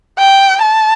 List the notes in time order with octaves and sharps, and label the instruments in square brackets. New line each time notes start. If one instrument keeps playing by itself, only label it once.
[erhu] G5
A5